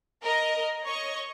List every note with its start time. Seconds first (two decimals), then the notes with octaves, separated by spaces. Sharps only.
0.23 A#4 D#5
0.83 C#5 D#5 C#6